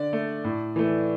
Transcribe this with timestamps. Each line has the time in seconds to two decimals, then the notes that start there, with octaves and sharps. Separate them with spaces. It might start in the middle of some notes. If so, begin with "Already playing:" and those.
Already playing: D3 D5
0.13 A3
0.44 A2
0.76 E3 A3